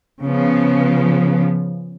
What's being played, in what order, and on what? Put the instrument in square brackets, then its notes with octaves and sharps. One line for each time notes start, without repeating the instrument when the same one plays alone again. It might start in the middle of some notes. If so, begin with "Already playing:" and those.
[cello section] C#3 F3 B3